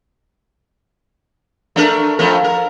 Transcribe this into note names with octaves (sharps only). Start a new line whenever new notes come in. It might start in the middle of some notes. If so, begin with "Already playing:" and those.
A3 D4 A#4
F2 A3 A#4
A#4